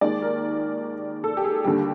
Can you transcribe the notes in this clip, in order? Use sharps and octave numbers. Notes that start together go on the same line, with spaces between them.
D#2 D#3 G#3 D5
A#4
A4
G4
G#4
D#2 D3 G3 G4